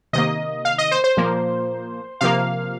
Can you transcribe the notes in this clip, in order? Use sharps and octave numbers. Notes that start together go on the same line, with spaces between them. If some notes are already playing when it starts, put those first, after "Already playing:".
C3 D#3 A#3 D#5
F5
D#5
C5
C5
A#2 F3 A#3
C3 F3 A#3 F5